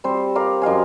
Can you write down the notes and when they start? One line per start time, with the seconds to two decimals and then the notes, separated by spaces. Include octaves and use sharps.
0.04 G3 C4 C5
0.35 A#4 D5 F5
0.62 F#2 D#5 F5 G#5